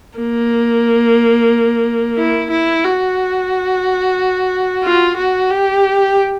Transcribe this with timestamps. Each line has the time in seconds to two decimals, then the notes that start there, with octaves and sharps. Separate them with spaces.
0.18 A#3
2.18 E4
2.51 E4
2.85 F#4
4.84 F4
5.17 F#4
5.50 G4